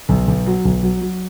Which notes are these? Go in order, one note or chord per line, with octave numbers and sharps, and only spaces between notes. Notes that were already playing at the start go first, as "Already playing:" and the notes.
B1
B1
F#3
B1
F#3
F#3